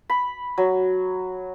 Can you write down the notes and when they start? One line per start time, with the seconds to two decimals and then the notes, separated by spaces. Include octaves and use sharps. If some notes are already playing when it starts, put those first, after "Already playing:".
0.10 B5
0.58 F#3